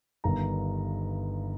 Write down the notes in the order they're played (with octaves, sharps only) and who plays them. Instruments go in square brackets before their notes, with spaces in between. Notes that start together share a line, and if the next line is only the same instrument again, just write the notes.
[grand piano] G1 G2 D#3 A#5